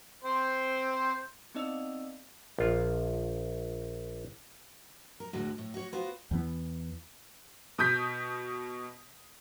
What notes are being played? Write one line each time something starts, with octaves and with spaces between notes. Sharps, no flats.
C4 C5
B3 C4 D#4 D5 D#5 E6
A#1 F4
A#4
D2 A2 G#3 F#4
A2
F#4 C#5
B3 F4 F#4 C5
E2 E3 B3
B2 D#6 G6 B6